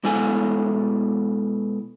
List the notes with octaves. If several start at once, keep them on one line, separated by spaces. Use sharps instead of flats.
B2 G#3 E4 A4 G#5